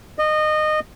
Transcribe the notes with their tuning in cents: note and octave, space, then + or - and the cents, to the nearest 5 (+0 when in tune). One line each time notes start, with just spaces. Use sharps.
D#5 -20